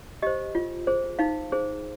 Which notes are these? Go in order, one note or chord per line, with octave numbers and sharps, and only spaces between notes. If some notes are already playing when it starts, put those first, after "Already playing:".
G4 C5 D#5
F4
G#4 C5
D#4 F5
G#4 C5